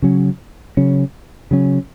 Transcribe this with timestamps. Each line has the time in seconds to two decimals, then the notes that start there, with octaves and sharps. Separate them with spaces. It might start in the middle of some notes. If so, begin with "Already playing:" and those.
0.02 C#3 F#3 C#4
0.77 C#3 F#3 C#4
1.51 C#3 F#3 C#4